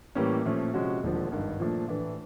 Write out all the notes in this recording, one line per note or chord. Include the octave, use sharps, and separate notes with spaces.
A2 E3 G3 A#3 C#4
A#2 F3 A3 C#4
C3 F3 G#3 C#4 F#4
E1 D#2 D3 F3
G#1 G2 D#3
A#2 F3 A3 D4
A2 E3 A3 D4